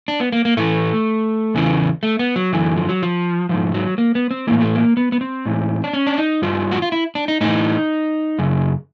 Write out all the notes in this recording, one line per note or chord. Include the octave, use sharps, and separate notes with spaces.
D4
B3
A#3
A#3
A2 E3 A3
E2 C#3 E3
A3
B3
F#3
F#2 D3 E3
F3
F#3
F3
G#2 D#3 F3
F#3
A#3
B3
C4
A2 E3 A#3
A3
A#3
B3
B3
C4
A2 E3
D4
C#4
D4
D#4
G2 D#3 F4
F#4
F4
E4
D4
D#4
A2 E3 D#4
F#2 C#3